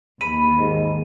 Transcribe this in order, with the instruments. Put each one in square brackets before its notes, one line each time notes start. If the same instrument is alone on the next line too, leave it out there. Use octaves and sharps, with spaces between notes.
[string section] D#2 [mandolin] B5 [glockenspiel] D#7
[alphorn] G#2